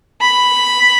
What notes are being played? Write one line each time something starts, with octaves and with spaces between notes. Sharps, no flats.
B5